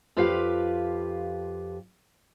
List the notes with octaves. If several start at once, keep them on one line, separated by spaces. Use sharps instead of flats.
F2 F4 G4 B4 F5